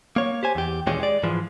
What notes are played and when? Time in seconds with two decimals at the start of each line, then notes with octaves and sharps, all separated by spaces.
0.16 A#3 C#5
0.43 G4 C5 G#5
0.55 E2 G4
0.87 D#2 A#2 E3 G#3 C#4 G4
1.00 G#3 D5
1.23 G#2 E3 F3 G#3